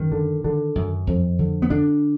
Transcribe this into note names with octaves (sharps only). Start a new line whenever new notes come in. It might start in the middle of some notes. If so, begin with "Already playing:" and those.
Already playing: F#2 D#3
D3
D3
F#2
F2
D3
B3
D3 D4